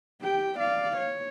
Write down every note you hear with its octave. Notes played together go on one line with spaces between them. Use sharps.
G4 G5
D5 F5
C#5